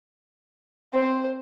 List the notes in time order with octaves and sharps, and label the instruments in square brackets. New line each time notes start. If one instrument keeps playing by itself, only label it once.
[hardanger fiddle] C4 [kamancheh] C5